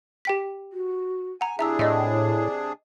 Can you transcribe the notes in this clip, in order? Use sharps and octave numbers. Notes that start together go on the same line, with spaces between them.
G4 G5 B6
F#4
F#5 G#5 A#5
C3 D4 E4 G#4 E5 A#5 E6
A2 D#5 E5